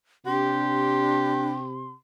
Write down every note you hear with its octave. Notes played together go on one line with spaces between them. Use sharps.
C3 D4 G4 C6